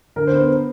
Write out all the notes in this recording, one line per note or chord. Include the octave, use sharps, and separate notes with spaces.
D3 A#4
C5
B3
C5